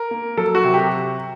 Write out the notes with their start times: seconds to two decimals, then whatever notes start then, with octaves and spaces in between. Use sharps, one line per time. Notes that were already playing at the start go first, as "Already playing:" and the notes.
Already playing: A#4
0.11 A#3
0.37 F#3 A4
0.55 F#4
0.64 C3
0.74 G4